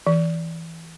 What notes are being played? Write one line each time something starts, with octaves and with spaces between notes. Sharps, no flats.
E3